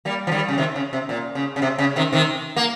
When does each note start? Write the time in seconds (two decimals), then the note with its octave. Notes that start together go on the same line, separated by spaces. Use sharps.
0.05 G3 A#3
0.27 F3
0.31 D#3 G3
0.48 C#3
0.58 C3 D#3
0.76 C#3
0.93 C3
1.09 A#2
1.35 C#3
1.56 C#3
1.62 C3
1.79 C#3
1.96 C3 D#3
2.13 C3 D#3
2.56 A#3